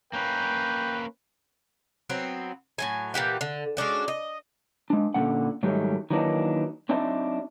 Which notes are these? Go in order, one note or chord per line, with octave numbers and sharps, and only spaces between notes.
A#3 C#4 B4 G5
F#3 B3 C4
A2 F#3 G#5
A#2 E3 G4 F#5
D3
G#3 C#4 D4 F#4
D#5
G#3 D4
A#2 D3 G3 C#4 F#5
G#2 D#3 F#3 G3 A3
D#3 E3 F#3 A#3 D4 D#4
F#3 C4 D4 D#4 D5 E5